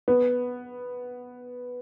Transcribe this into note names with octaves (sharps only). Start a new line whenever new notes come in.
B3